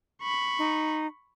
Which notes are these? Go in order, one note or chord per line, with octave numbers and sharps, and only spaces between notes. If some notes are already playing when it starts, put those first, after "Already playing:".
B5 C#6
D#4